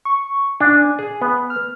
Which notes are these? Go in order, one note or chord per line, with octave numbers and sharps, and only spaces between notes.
C#6
D4 G#5
G#4
B3
F6